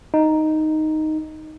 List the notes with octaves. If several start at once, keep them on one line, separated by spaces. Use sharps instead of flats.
D#4